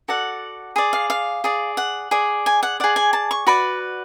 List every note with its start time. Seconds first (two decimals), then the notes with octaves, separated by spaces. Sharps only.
0.08 F#4 A4 D5 F#5
0.76 G#4 D5
0.93 F5
1.10 F5
1.44 G#4 D5
1.77 F#5
2.11 G#4 D5
2.46 G#5
2.63 F#5
2.80 G#4 D5 F#5
2.96 G#5
3.13 A5
3.31 C#6
3.47 F#4 B4 D5 B5